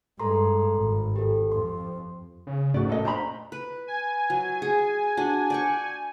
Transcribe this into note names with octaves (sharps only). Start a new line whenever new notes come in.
G2 G#3 A4 A#5 C6
G#1
G4 A4
F2 C6
C#3
F1 G#2 A3 C#4 F#4 D5
A#2 A4 D#5
D4 C5 A#5 B5
B4
G#5
F#3
G#4
D4 F#4
D5 G5 C#6